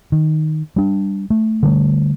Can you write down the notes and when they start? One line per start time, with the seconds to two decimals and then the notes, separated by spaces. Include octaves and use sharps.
0.12 D#3
0.76 G3 D4
1.30 A3
1.63 D3 G3 A3